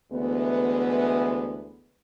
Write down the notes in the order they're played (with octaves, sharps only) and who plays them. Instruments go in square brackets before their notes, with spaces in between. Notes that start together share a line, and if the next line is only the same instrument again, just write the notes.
[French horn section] D2 E3 G#3 B3